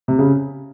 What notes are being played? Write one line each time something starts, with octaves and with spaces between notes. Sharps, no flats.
C3
C#3